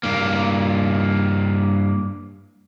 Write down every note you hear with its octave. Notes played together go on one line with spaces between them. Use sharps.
G2 A#3